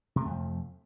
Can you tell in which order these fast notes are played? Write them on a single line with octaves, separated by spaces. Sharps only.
C3 A3 F2 F3